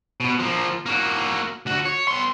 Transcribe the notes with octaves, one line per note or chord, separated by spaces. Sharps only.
B2 B3
F3 A#3
A#3 F#4
D2 F#4
C#5
B3 C6